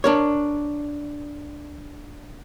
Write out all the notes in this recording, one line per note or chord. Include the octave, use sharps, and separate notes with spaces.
D4 A#4 C#5